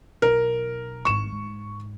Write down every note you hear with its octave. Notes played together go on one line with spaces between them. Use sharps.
B1 A#4
G#1 G#2 C#6 E7
G#2